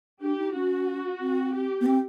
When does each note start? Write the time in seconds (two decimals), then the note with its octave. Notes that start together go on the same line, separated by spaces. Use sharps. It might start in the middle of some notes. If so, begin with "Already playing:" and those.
0.21 D4 G4
0.38 D#4
0.54 C#4 F#4
1.20 C4
1.53 G4
1.81 B3
1.86 C4